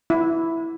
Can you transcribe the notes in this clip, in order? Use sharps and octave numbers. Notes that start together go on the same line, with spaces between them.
E4